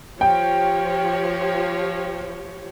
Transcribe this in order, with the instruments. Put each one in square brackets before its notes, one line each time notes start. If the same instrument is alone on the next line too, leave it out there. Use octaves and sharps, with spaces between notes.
[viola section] F3 G4 C#5 [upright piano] G5